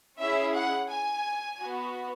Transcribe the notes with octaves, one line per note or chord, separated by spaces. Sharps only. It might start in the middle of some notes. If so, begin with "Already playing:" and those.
C#4 E4 G#4 E5
F#5
G#5
B3 F#4